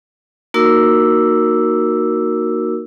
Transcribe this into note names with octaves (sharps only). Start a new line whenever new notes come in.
A#3 D#4 F#4 A#4 D6 E6